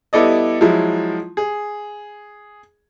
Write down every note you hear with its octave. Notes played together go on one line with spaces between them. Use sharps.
G3 B3 E4 A4 D5 D#5
F3 F#3 G#3 E4
G#4